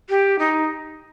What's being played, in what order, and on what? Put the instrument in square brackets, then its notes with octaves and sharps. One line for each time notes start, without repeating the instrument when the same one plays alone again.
[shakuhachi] G4
D#4